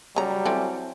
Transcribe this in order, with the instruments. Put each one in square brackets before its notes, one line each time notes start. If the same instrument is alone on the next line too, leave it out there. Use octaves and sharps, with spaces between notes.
[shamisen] C#3 A#5 [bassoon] F#3 [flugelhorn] G3
[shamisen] E3 C4 A4